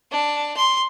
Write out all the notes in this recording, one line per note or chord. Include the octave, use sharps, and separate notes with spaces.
D4
C6